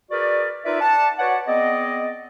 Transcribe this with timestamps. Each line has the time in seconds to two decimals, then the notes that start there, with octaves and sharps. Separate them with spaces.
0.11 F#4 G#4 A#4 B4 D5
0.65 D#4 F4 A#4 B4 D5 E5
0.81 D5 F#5 A5
1.19 F#4 B4 C#5 D5 F#5
1.47 B3 C4 G#4 D5 D#5